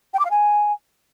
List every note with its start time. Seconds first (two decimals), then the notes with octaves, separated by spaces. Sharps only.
0.14 G5
0.19 D6
0.25 F5
0.31 G#5